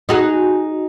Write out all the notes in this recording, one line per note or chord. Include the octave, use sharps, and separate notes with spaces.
D#4 F#4 G#4